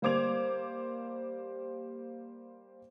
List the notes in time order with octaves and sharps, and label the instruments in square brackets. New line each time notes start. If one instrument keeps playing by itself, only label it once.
[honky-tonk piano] G3 A#3 C5 D6 G#6 F7